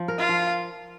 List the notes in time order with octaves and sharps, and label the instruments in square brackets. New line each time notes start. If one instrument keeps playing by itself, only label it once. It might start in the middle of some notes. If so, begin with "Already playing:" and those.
Already playing: [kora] F3
A#4
[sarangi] F4
[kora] F3